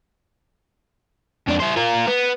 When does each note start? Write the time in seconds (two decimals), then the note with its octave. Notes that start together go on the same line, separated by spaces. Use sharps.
1.48 F2 D4
1.60 E4 C5
1.77 F4 A#4
2.07 B3